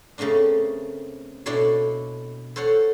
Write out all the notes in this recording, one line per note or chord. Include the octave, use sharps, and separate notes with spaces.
C#3 A3 A#3 C4 D4
B2 D4 E4 A4 C#5 C6
A4 C5 C#5 F#5